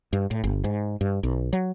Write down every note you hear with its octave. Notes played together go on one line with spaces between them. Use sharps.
G2
A2
G1
G#2
G2
B1
F#3